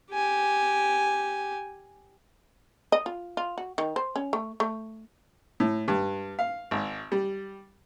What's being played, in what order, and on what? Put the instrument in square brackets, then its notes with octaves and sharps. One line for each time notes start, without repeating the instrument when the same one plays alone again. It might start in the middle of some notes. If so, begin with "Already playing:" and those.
[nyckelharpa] G4 G#5
[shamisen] D#5
F4
F4
F#4
D#3
C5
C#4
A3
A3
[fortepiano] A2
G2
F5
G#1
G3